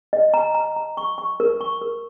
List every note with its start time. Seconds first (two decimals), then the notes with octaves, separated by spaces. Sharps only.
0.13 D#5
0.34 A#5
0.55 A#5
0.76 A#5
0.97 C#6
1.18 C#6
1.40 A#4
1.61 C#6
1.82 A#4